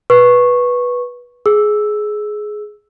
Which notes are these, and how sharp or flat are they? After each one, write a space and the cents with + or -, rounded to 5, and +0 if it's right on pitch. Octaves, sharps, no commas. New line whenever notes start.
B4 -10 C#6 -10
G#4 +15 E6 +0